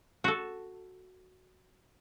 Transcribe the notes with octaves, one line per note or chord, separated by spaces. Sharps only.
F#4 A4